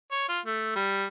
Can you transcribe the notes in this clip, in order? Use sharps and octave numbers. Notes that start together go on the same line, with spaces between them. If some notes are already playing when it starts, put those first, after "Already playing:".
C#5
F4
A3
G3